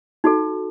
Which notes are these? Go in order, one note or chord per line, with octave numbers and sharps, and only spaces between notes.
D#4 F#4 A4